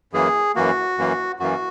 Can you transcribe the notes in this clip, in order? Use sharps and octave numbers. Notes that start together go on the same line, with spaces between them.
F#2 E3 A#3 G#4
F#2 E3 A#3 F#4
F#2 E3 A#3
F#2 E3 A#3 F#4